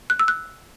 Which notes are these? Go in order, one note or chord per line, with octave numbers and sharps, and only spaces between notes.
F#6
E6
F#6